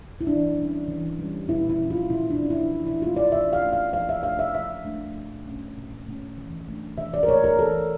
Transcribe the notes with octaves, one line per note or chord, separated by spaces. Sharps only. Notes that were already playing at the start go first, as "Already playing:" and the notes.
E4
E3 D4
G3
C#4
E3
G3 C#4
A#2 E4
E4
F3 C#4
F4
A#2 E4
D4
F3 C#4
E4
E3
E4
A3 C#4 F4
D5
E3 E5
F5
A3 C#4
F5
F3 F5
E5
A3 D4 F5
E5
F3 E5
A3 D4
A#2
A3 C#4
A#2
A3 C#4
E3
A3 D4
E3 E5
D5
A#4
A3 D4 C#5
A#4
E3 A4